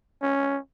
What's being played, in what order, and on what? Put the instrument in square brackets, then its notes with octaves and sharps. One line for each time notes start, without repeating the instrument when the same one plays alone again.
[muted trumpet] C#4